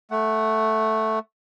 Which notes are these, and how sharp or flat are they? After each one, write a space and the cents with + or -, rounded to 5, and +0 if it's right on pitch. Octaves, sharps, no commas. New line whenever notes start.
A3 +0 F#5 +15